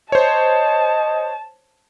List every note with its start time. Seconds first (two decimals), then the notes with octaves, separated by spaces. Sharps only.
0.12 C5 C#5 D#5 A5